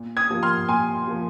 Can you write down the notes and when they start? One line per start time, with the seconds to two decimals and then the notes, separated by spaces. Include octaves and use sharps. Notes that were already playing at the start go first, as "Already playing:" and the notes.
Already playing: A#2
0.17 D#6 G#6
0.30 F3 A#3
0.43 C6 F6
0.69 A#2 G#5 C6
1.07 F3 A#3